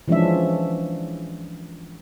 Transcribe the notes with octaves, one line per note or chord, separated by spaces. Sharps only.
E3 F3 G#3 C#4 D4 E5